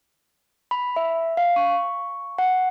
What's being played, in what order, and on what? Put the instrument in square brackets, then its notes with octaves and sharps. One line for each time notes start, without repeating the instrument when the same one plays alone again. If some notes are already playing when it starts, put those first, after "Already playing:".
[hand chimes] B5
E5
F5
C#6
F#5